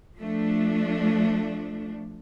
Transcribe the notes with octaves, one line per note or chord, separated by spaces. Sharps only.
F3 A3 D4